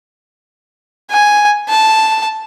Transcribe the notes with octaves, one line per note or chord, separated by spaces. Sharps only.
G#5
A5